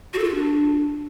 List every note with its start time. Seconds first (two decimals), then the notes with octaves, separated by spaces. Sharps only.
0.14 F#4
0.19 A4
0.24 F4
0.29 F#4
0.34 D4